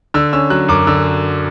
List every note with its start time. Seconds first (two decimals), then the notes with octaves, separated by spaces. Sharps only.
0.14 D3 E6
0.33 C#4 E6
0.50 F#3 F#6
0.68 F#2 D6
0.87 D3 E6